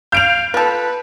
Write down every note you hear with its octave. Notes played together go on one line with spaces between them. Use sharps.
F5 G6 D7 F7
F4 A4 B4